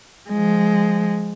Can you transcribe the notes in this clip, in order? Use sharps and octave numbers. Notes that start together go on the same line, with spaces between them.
F3 G#3